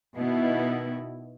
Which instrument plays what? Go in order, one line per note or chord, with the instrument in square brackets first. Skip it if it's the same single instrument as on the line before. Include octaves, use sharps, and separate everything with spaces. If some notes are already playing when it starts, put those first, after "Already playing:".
[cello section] B2 D#3 B3 E4